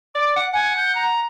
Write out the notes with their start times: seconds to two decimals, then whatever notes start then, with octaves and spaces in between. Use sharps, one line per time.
0.15 D5 D6
0.36 F#5
0.53 F#5 G#5
0.77 G6
0.95 A#5